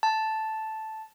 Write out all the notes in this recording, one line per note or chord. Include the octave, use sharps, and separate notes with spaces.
A5